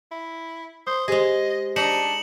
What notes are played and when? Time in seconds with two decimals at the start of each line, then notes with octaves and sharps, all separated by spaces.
0.12 E4
0.87 C5 D#6 G6
1.08 G#3 G4 G#4 C5 D#5
1.76 D4 D#4 C#7 E7 F#7